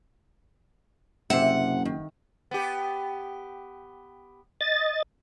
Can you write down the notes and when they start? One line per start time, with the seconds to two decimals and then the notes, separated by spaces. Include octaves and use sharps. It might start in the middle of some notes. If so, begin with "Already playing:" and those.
1.30 F#1 C3 E5 F#5
1.85 D#3
2.51 B3 G4
4.61 D#5 A6